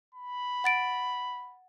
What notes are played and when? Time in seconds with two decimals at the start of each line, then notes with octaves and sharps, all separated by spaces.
0.15 B5
0.64 F#5 A6 D7